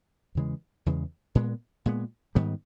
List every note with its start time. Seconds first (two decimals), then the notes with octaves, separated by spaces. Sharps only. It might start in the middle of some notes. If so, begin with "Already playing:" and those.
0.35 E2 C#3 E3 G#3
0.86 E2 C#3 E3 G#3
1.35 A#2 G#3 B3
1.86 A#2 G#3 B3
2.35 G#2 D#3 G3 B3